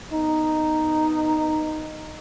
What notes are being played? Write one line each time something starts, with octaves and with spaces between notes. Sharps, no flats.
B3 D#4